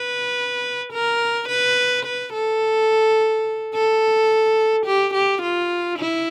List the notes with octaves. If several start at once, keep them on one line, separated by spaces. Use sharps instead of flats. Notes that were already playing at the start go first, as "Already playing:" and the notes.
Already playing: B4
A#4
B4
B4
A4
A4
G4
G4
F4
E4